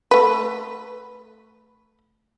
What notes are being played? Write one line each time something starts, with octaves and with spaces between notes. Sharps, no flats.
A3 B4